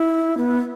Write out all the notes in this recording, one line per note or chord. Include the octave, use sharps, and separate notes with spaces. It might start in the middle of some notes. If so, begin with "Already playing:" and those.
Already playing: E4
B3